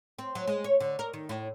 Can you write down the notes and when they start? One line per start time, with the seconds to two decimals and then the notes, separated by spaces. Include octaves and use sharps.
0.19 C4
0.35 F#3
0.47 G#3
0.64 C#5
0.80 D3
0.99 A#4
1.13 D#3
1.29 A2